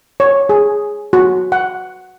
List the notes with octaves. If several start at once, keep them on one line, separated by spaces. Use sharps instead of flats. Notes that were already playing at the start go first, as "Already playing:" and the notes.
C#5
G#4
F#4
F#5